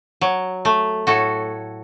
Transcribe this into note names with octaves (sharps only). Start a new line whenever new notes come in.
F#3
A3
A2 F#4 A4